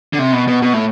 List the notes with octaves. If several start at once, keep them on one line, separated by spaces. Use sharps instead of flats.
D3
C3
B2
B2
B2
A2